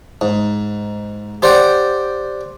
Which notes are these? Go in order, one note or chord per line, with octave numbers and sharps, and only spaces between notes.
G#2
G4 C5 D5 F#5 G5